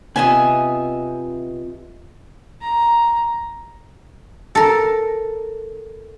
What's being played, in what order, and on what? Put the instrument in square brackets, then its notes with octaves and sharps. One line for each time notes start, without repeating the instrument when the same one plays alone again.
[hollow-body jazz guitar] C3 B3 F4 [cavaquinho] D#5 E5 G#5
[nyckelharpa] A#5
[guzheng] A4 A#4